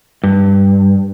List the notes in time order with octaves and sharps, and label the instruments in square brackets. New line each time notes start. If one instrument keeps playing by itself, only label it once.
[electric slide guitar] G2